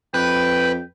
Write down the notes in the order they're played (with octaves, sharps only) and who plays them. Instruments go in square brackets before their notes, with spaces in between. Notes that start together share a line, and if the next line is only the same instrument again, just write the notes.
[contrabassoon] F2 [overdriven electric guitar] B4 [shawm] G5